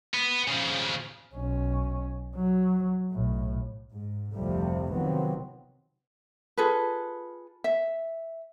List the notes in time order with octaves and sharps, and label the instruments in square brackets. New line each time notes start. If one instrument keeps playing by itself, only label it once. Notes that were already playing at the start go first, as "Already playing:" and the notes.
[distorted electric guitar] B3
C#3 F3
[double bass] B1 C#4
F#3
B1 A2
[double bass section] G#2
F1 D2 C3 F3 G3 A3
C3 D#3 F3 F#3 B3 C4
[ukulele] F4 G#4 A4 B4
E5